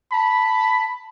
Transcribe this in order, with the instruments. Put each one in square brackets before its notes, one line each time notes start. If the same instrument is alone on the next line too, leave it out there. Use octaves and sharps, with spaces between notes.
[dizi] A5 [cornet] B5